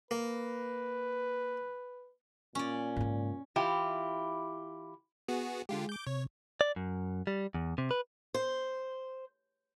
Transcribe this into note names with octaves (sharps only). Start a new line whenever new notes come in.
A#3 B4
A#2 C#4 D5
G#2 C#3
E3 E4 F4 G4
B3 F#4 G#4
D3 G#3 F4 G4
D6 G6
C3 C#5
D5
F#2
G3
E2
C3
B4
C5